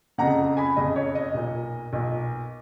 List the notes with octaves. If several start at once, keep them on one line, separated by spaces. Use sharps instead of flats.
F#1 F2 C#3 F#5 A#5
G#5 B5
F#1 F2 C#3 D#5
C#5
D#5
B1 A#2
B1 A#2